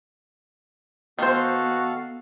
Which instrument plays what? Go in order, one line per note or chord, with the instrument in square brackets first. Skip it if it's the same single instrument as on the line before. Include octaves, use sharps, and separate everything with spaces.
[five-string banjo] D#3 C5 [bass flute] B3 [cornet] F#4 [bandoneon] A4 F5